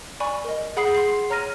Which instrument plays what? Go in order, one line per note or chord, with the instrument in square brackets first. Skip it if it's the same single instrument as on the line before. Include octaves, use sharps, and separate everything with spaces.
[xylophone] D5 G#5 B5 C#6
A#4 D#5
G#4 F#5 B5 D#6 C7
C6 C7
C#5 A#5 F6 A#6 D#7